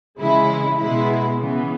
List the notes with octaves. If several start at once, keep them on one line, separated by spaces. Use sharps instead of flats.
C#3 E3 G#3 E4
B2 G#3 B3 E4
C#3 E3 B3